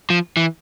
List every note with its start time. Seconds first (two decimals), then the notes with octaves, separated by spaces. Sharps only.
0.10 F3
0.37 E3